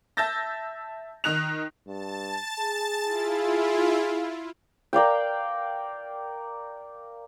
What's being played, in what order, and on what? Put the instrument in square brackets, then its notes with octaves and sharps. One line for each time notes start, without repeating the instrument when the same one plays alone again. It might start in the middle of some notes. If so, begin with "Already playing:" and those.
[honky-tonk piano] E5 A5 E6 G6 A6 A#6
D#3 D#4 F#6 F7
[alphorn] G2 [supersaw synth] A5 A6
[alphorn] G#4
[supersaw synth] E4 F4
[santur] A#4 D5 F5 G5